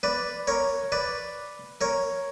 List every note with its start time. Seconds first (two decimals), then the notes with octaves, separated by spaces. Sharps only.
0.03 B4 D5
0.47 A#4 C#5
0.92 B4 D5
1.81 A#4 C#5